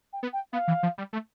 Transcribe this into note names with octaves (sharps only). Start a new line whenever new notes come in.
G5
B3
G5
B3 F5
E3
F3
G3
A3